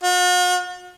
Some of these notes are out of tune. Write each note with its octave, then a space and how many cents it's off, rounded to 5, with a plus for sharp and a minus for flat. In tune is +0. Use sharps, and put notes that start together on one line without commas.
F#4 -45